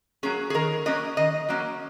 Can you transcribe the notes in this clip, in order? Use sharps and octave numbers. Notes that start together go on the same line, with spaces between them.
F#3 A#3 C#4 G#4
G#4
D#3 A#4
F#3 A#3 C#4 D#5
D#3 D#5
F#3 A#3 C#4